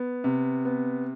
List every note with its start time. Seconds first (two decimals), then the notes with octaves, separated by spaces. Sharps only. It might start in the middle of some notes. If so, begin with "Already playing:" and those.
Already playing: B3
0.24 C3
0.65 B3